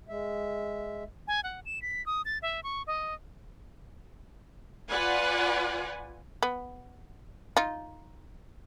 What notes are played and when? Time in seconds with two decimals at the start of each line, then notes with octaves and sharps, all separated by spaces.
0.09 G#3 E5
1.28 G#5
1.44 F#5
1.65 E7
1.82 B6
2.06 D#6
2.25 A6
2.42 E5
2.64 C#6
2.87 D#5
4.91 F4 B4 D5 F#5 G#5
6.43 B3
7.57 D#4 F4